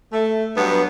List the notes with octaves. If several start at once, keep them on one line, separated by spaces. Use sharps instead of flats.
A3
G2 F#3 B3